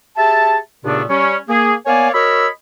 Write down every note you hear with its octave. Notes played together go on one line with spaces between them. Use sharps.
G4 G#4 E5 A5
D#2 A#2 C#3 A3 B3 D4
G3 C#4
A#3 G#4
A#3 B3 C#5 D5 F5 G#5
F#4 A#4 C#5 D#5 B5 E6